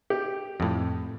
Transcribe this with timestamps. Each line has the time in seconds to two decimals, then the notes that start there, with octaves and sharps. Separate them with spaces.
0.10 G4
0.60 F2 A2